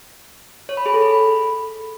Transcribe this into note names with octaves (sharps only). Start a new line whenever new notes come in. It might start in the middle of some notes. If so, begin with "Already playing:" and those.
C#5
B5
G#4
A4
B5